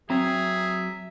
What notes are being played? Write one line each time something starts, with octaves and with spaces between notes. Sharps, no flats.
F#3 C4 G#4 E5 A#5